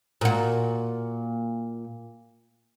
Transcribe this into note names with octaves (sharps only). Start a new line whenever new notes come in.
A#2 F#4